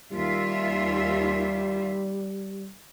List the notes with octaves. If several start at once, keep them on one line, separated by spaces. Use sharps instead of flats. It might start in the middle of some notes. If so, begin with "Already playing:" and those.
D#2 G3 F4 E5